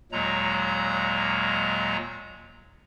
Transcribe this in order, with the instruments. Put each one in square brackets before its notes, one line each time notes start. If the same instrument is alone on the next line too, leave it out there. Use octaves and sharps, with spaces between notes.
[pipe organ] D#2 A#2 F#3 G#3 A#5